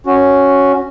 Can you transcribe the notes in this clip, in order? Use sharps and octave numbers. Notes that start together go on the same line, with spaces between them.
C#4 F#4